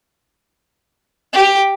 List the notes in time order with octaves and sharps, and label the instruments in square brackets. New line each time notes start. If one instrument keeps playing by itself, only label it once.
[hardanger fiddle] G4